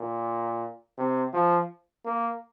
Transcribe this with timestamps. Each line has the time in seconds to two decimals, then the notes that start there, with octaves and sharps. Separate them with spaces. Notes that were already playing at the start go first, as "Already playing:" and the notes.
Already playing: A#2
0.98 C3
1.34 F3
2.05 A#3